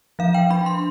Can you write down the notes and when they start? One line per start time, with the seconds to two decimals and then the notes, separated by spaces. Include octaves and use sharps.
0.19 F3 F5
0.34 G5
0.50 D4 B5
0.66 C6